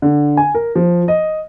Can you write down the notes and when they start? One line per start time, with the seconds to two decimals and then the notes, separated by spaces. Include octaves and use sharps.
0.02 D3
0.37 G#5
0.55 A#4
0.75 F3
1.08 D#5